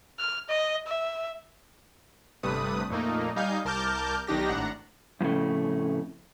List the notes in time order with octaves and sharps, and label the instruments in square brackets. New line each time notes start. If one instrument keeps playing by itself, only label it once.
[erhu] F6
D#5
E5
[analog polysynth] G1 G2 C3 A3 B4 D#6
F2 A#2 A3 A#3 D#4
G3 D#4 F5 G#5 G6
C2 A#4 A5 D6 F6 G6
B1 D#3 D4 D#4 G4 A#6
G#1 A2 D4 F#5 A#5
[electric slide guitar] F2 A2 C#3 A3